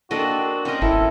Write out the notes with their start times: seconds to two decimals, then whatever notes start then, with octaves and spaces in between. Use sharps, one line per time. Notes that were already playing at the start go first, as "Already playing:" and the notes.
0.11 A#3 C4 D4 F#4 A4 D#5
0.65 C4 C#4 A#4 D#5
0.82 G#1 D#3 E4 A4